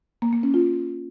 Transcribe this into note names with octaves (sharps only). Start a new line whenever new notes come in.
A#3
A#3
C#4
F4